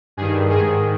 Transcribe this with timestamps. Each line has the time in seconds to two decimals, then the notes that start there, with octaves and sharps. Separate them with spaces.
0.17 G2 D#3 G#4
0.50 G#2 D#3 G#4